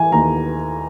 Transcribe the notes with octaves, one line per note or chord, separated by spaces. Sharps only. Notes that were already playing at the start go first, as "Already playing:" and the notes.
Already playing: E3 G#5
D#2 A#5